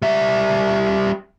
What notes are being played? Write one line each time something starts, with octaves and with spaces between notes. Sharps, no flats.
G3 E5